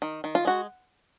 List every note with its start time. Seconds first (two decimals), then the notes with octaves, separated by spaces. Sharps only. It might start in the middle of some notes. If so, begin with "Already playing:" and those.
0.02 D#3
0.24 D#3
0.35 F4
0.45 G#3 F#4